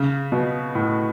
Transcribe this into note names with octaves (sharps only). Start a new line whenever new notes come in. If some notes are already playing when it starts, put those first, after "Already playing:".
Already playing: C#3
B2
A2